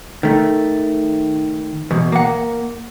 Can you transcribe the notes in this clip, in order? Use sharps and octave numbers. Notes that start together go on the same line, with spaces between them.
D#3 A3
E2 B2
A#3 F#5